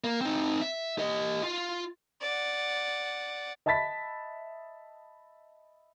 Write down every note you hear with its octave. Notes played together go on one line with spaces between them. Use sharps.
A#3
C4 D#4
E5
G4 D#5
F4
D5 F#5
D#5 E5 A5 B5 A6 B6